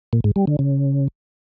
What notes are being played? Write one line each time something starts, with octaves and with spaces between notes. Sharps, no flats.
A#2
G#2
G3
D3
C#3